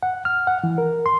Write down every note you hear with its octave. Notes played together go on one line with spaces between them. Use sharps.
F#5
F6
F#5
E3
A#4
C6